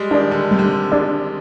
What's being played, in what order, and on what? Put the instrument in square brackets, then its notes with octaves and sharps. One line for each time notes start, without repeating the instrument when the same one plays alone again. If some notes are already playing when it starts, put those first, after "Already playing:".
Already playing: [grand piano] G3 G#3
[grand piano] D#3 [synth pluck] D4 G#4 D5
[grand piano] D3
[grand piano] C3 [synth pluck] G3
[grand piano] D3
C3
[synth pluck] D4 G#4 D5